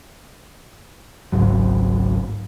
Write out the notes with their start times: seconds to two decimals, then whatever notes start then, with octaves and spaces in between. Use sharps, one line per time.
1.32 G#1 C#2 G#2 F#3